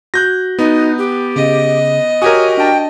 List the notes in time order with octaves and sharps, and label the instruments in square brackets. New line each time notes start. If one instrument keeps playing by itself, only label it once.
[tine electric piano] F#4 [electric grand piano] F#6 G6 A#6
[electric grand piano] B3 [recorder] D#4
[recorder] G4
[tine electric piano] C#3 [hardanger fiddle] D#5
[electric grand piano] F#4 G4 A#4 [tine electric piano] C#5 D#6 [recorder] G#5
[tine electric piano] D4 A5 [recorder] G5